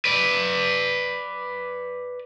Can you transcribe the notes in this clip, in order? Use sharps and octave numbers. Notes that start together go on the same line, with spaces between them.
B4 D5